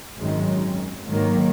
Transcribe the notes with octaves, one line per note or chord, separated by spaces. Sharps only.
G#1 F#2 D#3 G#3
G#2 D#3 F#3 A#3